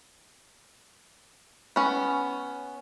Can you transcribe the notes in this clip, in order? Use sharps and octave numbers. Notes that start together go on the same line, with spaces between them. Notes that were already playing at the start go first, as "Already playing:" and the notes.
B3 C#4